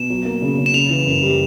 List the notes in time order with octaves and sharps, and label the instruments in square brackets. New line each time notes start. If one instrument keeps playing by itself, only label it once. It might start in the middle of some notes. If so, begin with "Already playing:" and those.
Already playing: [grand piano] B2 [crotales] E7
[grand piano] F#3
A#3
C#3
C#3
[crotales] E7
[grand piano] C#3 [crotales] F7
[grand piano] E3
F#2
G3